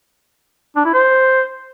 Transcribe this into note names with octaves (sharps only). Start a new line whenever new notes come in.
D4
E4
C5